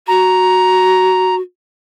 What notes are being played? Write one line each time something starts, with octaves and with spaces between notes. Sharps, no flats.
F#4 A#5